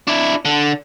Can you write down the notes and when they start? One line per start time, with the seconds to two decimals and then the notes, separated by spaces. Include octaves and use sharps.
0.07 D4 E4
0.45 D3